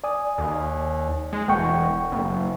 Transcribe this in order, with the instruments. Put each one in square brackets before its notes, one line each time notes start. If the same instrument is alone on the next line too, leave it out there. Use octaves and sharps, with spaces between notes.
[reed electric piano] D5 G#5 D#6
[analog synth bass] D#2
G#3
[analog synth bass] E1 [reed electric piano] F#5 G5 C#6
[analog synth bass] F#1